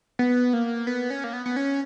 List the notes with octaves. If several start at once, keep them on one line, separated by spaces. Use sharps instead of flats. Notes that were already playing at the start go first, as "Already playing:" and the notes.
B3
A#3
B3
C#4
A#3
B3
B3
C#4